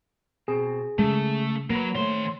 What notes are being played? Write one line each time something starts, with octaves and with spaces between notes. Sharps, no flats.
B2 C4 G#4
C#3 G#3 A3
F#3 A#3 A#4 B4
D#3 A3 C5 C#5 C6